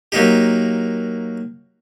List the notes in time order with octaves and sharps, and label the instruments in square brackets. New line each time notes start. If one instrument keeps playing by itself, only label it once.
[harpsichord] F#3 A#3 D#4 G4